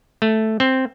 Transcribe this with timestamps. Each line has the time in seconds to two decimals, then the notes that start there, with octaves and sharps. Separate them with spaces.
0.22 A3
0.60 C4